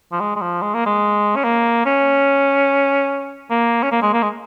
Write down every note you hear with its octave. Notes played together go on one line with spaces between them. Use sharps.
F3
G#3
G#3
F3
G#3
A#3
G#3
C#4
A#3
C#4
A#3
C#4
A#3
G#3
A#3
G#3